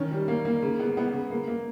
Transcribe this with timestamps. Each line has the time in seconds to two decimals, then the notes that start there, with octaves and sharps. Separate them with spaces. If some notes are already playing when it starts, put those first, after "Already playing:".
Already playing: D#3 C#4
0.12 G3
0.28 A#3
0.45 A#3
0.62 C#3
0.79 B3
0.97 B3
1.13 C#3
1.30 A#3
1.48 A#3